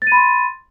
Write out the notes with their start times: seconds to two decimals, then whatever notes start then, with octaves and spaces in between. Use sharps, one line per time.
0.02 A6
0.07 D#7
0.12 B5
0.17 C6